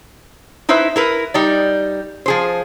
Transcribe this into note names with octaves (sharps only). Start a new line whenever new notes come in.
D#4 E4 B4 C5 E5
E4 A#4 B4
G3 D#4 D5
F3 G#4 C5